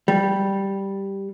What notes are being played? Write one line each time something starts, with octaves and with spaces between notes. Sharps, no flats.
G3